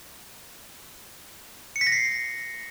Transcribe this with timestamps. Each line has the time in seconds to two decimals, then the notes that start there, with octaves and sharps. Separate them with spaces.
1.76 C#7
1.81 B6
1.87 A#6
1.92 C7